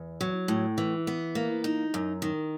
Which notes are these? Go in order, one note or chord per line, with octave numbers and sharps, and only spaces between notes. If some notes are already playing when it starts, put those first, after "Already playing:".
Already playing: E2
F#3
A2
E3
B3
A#3
D#4
F#2
D#3